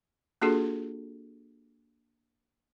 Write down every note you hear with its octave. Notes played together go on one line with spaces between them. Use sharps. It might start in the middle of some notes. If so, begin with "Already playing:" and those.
A#3 D4 F4 F#4 G#4 A4